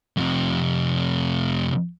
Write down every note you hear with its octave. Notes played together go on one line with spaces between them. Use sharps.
F2 C3